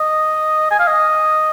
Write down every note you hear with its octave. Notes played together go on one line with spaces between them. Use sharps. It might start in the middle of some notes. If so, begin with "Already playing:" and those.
Already playing: D#5
G#5
F5
D#5